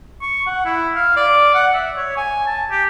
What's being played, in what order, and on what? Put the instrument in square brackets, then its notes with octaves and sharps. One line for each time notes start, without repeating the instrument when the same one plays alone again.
[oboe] C#6
F#5
E4
F5
D5
F#5
E5
C#5
G#5
A5
G4